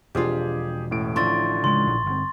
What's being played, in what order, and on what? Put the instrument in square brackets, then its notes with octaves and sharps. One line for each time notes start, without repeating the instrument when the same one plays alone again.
[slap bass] E1 [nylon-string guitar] F2 D4 F4 [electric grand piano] G4 G#4
[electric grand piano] A1 A2 D7
[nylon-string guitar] D3 F3 E4 [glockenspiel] C6 C#6 A6
[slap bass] C#3 G#3 [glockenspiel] C6
[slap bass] A#1
G1 C4